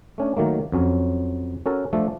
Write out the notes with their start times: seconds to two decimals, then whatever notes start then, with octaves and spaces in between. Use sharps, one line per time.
0.18 A3 C#4 D4
0.37 D#3 F#3 A3 A#3
0.72 F2 F#3 C#4
1.66 C#4 F#4 A4 A#4
1.93 F3 A3 D4 A4